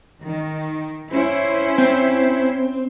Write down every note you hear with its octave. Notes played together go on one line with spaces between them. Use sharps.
D#3
C#4 E4 C5
C4